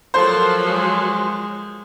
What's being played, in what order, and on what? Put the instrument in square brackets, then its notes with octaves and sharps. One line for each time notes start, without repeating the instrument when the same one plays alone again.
[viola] F3 F#3 [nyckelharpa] A4 A#4 [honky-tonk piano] C5
[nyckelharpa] G#3